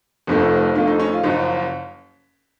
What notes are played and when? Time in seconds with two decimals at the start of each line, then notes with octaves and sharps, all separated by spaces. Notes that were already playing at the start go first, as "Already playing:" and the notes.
0.27 F1 F2 D#3 A3
0.75 F2 D#3 A3 F4
0.87 D#4
1.00 C#4
1.12 F4
1.24 F#1 F#2 F3 D#4